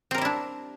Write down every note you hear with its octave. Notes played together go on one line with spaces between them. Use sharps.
G3 C4 D4 E4 A#4